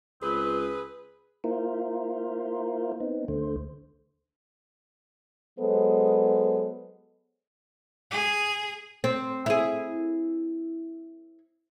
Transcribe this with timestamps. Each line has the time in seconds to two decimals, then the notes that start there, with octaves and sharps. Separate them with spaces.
0.22 C#2 C4 G#4 B4
1.44 A#3 E4 F4 A#4 C5
3.00 B3 C4 D#4
3.28 D2 D3 A3 C5
5.59 F#3 G#3 B3 A4 B4 C5
8.11 G#4
9.04 C4
9.46 E4 G#4